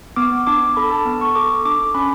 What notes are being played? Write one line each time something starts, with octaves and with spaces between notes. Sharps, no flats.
B3 D6
D4 D6
A4 B5
A5
B3
C#6
A4 D6
D4 D6
C#4 B5